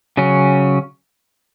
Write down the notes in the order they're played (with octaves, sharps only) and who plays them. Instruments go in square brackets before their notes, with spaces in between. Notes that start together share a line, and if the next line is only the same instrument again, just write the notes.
[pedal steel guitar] C#3 F#3 C#4